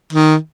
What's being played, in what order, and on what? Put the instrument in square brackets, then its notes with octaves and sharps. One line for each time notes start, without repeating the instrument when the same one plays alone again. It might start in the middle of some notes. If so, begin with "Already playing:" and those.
[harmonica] D#3